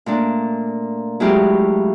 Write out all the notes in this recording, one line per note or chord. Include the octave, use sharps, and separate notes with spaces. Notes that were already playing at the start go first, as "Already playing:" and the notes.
A#2 A3 D4
F#3 G#3 A3 E4 F4 G4